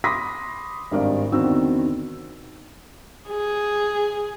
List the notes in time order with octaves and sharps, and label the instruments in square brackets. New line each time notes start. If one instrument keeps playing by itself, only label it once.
[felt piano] B5 C6 D6 D#6 A#6 B6
G#1 G2 A#4 D5 F5
E2 D3 D#3 C4 F#4 E6
[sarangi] G#4